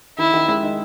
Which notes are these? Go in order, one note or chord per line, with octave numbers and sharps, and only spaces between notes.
D#3 E4
D#3
G#3
D#4